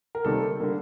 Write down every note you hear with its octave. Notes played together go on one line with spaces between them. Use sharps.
A#4
C3 D#3 G3 A#3 A4
D3 G3 A#3